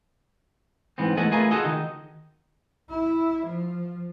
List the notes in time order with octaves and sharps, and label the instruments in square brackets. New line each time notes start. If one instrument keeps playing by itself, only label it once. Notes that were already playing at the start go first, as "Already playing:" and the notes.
[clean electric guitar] G#2 E3 B3 C4
E2 A3 A4 D#5 F#5 G#5
A3 F4 G#4 A#4 B4 G#5
F4 F#4 G#4 A4 D#5
D#3 D#4
[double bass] E4
F3